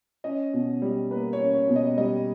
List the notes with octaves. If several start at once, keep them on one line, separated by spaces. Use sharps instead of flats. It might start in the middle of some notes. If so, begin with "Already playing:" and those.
C#4 D#5
B2
G3
A#3 B4
C#5
C#4
C#5
B2
D#5
G3 D#5